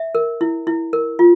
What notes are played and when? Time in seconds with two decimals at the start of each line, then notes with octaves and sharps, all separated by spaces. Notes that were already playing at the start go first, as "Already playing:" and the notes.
Already playing: E5
0.15 A#4
0.41 E4
0.67 E4
0.93 A#4
1.19 F4